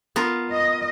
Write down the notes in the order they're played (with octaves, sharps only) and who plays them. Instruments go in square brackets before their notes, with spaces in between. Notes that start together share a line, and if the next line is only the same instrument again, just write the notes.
[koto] B3 F4 A#4
[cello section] D#5